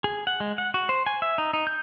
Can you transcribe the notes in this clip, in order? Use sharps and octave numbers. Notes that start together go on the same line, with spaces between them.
G#4
F#5
G#3
F#5
F#4
C5
G#5
E5
D#4
D#4
G6